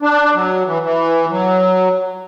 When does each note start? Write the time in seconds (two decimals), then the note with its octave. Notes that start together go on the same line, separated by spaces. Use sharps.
0.02 D4
0.34 F#3
0.66 E3
0.82 E3
1.30 F#3